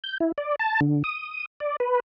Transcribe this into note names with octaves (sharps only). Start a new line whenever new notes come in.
G6
E4
D5
A5
D3
D#6
D5
B4